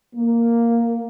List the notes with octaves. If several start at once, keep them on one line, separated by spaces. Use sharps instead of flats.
A#3